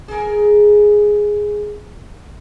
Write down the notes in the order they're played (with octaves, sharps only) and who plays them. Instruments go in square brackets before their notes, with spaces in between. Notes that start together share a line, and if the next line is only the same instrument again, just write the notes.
[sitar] G#4 A#4